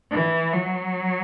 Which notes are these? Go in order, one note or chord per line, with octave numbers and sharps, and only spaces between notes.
E3
F#3